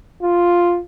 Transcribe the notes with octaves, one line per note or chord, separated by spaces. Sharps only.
F4